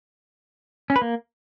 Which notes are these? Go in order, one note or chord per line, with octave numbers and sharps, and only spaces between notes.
C#4
B4
A#3